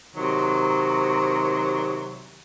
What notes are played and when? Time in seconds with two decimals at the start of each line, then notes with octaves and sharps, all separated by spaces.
0.15 C3 D#3 F#3